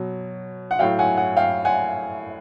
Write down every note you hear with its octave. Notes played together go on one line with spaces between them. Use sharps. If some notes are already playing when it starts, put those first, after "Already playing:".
Already playing: B2 F#3
F#5
A2 F#3 F5 G5
F#5 G#5
F#5 G#5
F5 G5
F#5 G#5